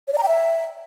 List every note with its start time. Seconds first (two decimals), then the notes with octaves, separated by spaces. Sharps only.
0.08 C#5
0.13 D5
0.18 A#5
0.23 G5
0.28 E5